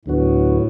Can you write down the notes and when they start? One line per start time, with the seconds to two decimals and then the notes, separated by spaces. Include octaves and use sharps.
0.05 D2 A2 D3 F#3 B3 F#4